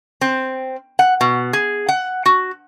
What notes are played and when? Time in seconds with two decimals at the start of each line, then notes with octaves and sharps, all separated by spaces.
0.21 C4
0.99 F#5
1.21 B2
1.53 G#4
1.88 F#5
2.26 F#4